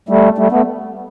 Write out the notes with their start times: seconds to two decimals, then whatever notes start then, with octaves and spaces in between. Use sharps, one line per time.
0.09 G3 A3
0.38 G3 A3
0.52 A3 B3